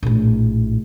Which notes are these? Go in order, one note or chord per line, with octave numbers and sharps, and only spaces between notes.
A#1 A2